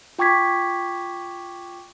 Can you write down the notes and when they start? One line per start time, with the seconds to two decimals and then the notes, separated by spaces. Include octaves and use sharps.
0.19 F4 G5 C#6 D6 G#6 B6